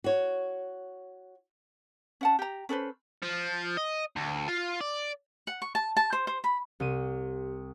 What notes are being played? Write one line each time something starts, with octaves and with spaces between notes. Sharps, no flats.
F#4 C#5
C#4 F#5 A5
G4 A#5
C#4 A4 B4 C5
F3
D#5
D2
F4
D5
F#5
C#6
A5
A5
C5
C5
B5
C2 G4 D#7